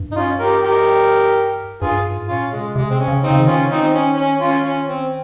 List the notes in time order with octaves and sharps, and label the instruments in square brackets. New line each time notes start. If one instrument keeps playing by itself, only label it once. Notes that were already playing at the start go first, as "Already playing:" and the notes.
Already playing: [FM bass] G2
[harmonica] D#4
C#4 F4
G4 A#4
G4 A#4
[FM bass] G2 [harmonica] F4 G#4
[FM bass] G#2
[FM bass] A#2 [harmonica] C#4 F4
[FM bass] C3 [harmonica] G#3
[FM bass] C3 [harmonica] G#3
[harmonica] C4
C#4
[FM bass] C#3
[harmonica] C4 D#4
[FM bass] C#3
D#3
[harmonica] C#4 F4
C4 D#4
C#4
C#4
C#4 F4
C#4
C4